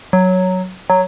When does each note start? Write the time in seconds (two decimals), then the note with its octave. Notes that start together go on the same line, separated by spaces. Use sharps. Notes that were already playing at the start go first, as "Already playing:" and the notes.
0.13 F#3
0.90 F#3